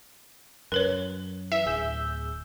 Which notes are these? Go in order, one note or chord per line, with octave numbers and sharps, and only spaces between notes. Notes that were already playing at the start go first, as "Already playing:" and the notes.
F#2 A#4 B4 C#5
E3 E5
D1 G#4 E6 G6